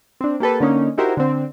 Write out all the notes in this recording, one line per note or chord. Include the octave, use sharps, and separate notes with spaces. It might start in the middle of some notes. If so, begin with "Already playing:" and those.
C4 D4
A#3 G4 A4 B4
D3 A#3 C#4 D#4
D#4 E4 F#4 G4 A#4 C5
D3 C4